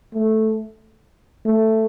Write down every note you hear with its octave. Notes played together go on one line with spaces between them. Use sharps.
A3
A3